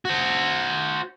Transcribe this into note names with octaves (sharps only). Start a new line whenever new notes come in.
F#4 C5